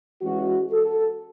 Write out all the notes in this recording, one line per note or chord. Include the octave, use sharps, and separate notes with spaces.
E3 G#3 C#4 F#4
A4